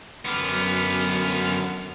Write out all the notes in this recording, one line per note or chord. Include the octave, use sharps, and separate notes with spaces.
F#2 D3 B3 F6